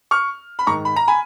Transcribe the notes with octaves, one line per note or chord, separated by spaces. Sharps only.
C#6 F6
B5
G#2 D#3 A#5 C#6
B5
A#5
G#5 B5